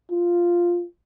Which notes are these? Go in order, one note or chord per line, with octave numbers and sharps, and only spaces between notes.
F4